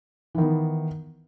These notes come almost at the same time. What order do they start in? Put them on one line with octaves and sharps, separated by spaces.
E3 D#3 B3